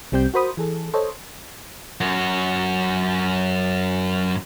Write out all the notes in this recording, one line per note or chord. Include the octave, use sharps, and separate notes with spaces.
C2 G3 C4 G4 G6
F#4 A#4 C5 B5 D#6
E3 G#4 A4
A4 C5 C#5 D#5
F#2 F#4